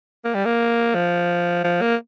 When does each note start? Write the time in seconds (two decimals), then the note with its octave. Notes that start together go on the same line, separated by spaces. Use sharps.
0.24 A#3
0.34 G3
0.45 A#3
0.94 F3
1.64 F3
1.81 A#3